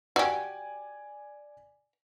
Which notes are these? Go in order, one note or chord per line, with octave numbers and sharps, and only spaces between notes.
F#4 G4 D5 G#5